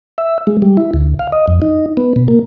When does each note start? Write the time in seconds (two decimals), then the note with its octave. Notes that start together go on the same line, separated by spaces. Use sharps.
0.18 E5
0.47 G#3
0.62 G3
0.77 E4
0.94 D2
1.19 F5
1.32 D#5
1.48 F2
1.62 D#4
1.97 B3
2.16 B2
2.28 A#3